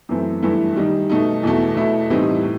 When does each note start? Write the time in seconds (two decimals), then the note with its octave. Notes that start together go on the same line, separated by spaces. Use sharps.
0.09 F#2 E3 A3 C4
0.43 G2 E3 A3 E4
0.76 D#3 G3 D#4
1.09 B2 A3 D#4
1.43 E2 B2 A3
1.76 B2 A3 E4
2.10 A2 E3 G3 C4 D#4
2.43 A2